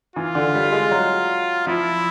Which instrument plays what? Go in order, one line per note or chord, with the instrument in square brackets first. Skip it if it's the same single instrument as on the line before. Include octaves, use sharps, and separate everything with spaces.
[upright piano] E3 [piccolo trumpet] F4
[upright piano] D3
G3
G#3
F#3
[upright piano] F3 [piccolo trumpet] E4